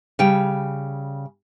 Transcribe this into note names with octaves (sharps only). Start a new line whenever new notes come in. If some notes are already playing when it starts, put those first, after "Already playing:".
C#3 G3 G5